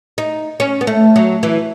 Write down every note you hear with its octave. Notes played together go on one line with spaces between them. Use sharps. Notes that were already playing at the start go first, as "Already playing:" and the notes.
D#4
C#4
B3
A3
F#3
E3